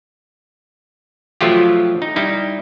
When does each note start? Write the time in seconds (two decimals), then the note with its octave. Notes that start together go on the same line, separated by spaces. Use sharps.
1.41 F3 F#3 A3 F4 G4
2.02 D#4
2.16 G3 D#4 E4